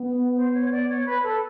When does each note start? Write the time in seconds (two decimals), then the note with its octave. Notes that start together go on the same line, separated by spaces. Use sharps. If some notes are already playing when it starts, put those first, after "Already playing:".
Already playing: B3
0.36 C5
0.53 C#5
0.71 D5
0.88 C#5
1.05 B4
1.23 A4